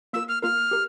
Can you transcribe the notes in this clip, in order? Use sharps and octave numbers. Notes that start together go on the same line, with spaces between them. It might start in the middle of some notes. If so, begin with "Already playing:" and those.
A#3 F4 A#4 E6
F6
A#3 F4 A#4 F6
G4 A#4